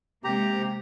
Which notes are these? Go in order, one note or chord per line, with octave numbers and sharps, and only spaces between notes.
C3 G#3 A#3 G4 A#5